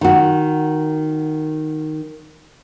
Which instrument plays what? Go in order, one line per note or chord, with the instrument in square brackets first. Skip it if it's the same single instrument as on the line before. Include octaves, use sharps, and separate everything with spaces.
[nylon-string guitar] D#3 F#4